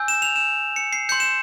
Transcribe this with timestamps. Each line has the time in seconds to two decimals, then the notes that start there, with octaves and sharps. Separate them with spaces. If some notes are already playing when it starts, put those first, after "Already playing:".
Already playing: G#5 E6 G6
0.08 E7
0.22 F7
0.36 E7
0.76 C#7
0.93 C7
1.09 C6 G6 C#7
1.20 E7